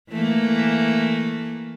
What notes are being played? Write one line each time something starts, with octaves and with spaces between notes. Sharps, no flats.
E3 A3 A#3